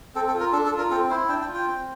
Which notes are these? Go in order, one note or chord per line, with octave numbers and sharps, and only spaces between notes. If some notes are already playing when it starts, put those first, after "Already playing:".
C4 A4
A4
F4
A#4
D4 A4
A4
F4
A#4
C4 A4
E4 C5
D4 G5
G5
F4
G5
C4